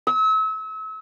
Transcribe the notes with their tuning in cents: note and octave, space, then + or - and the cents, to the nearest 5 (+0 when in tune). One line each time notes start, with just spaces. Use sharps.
E6 -35